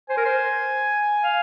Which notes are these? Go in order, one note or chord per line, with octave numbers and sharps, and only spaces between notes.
C5 G#5
A#4
C5
F5